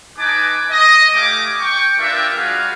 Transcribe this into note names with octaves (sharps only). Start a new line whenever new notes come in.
D#4 B4 G#5 A5 D6
D#5
A3 G4 F5 G#5 D6
G5 C#6
D4 F4 G4 A#4 B4 E5
G3 F4 F#4 G#4 B4 F5